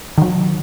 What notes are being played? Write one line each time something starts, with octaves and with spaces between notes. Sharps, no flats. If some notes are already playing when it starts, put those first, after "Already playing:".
D#3 F#3